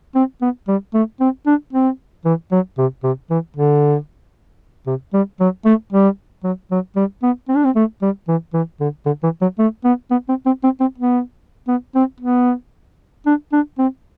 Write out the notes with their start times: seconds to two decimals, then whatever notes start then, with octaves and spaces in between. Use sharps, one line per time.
0.15 C4
0.41 B3
0.68 G3
0.94 A3
1.20 C4
1.46 D4
1.73 C4
2.25 E3
2.52 F#3
2.78 C3
3.03 C3
3.30 E3
3.57 D3
4.87 C3
5.14 G3
5.40 F#3
5.66 A3
5.92 G3
6.44 F#3
6.71 F#3
6.96 G3
7.23 B3
7.49 C4
7.56 D4
7.65 C4
7.76 A3
8.02 G3
8.28 E3
8.54 E3
8.80 D3
9.06 D3
9.23 E3
9.41 F#3
9.59 A3
9.85 B3
10.11 B3
10.29 C4
10.46 C4
10.63 C4
10.80 C4
10.98 B3
11.68 B3
11.95 C4
12.21 B3
13.26 D4
13.52 D4
13.79 C4